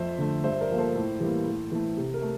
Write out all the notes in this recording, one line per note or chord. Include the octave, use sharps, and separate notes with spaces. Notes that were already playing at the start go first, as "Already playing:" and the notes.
Already playing: F2 C5 E5
D3 A3
G2 C5 E5
A#4 D5
F3 A#3
A4 C5
A2
E3 G3 A#3
A2
E3 A3
C3
A#4
A3